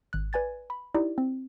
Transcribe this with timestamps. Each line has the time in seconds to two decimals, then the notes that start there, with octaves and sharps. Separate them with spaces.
0.13 G#1 F#6
0.33 B4 D5 G#5 G#6 A6
0.70 B5
0.95 D#4 E4 G4 D5
1.18 C4